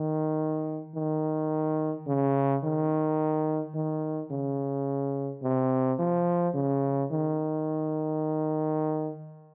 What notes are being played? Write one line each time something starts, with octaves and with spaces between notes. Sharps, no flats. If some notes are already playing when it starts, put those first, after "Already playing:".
Already playing: D#3
D#3
C#3
D#3
D#3
C#3
C3
F3
C#3
D#3